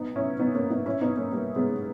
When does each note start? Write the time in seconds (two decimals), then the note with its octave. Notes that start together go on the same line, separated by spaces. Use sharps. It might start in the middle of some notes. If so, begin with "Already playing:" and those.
Already playing: B3 D#4
0.16 C#4 E4
0.39 B3 D#4
0.55 A#3 C#4
0.70 B3 D#4
0.86 C#4 E4
1.01 B3 D#4
1.17 A#3 C#4
1.32 G3 A#3
1.56 G#3 B3